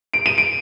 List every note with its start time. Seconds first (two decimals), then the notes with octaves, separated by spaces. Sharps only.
0.14 D7
0.26 D#7
0.38 D7